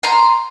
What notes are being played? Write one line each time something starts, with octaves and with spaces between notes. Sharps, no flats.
A#5 C6